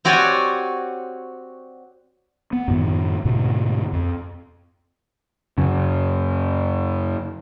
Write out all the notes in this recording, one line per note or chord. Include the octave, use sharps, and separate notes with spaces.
C4 F#4 G4 C#5 D5 G#5
B3
F#2 A2 D#3
D2 G#2 B2
F2
F#2 C#3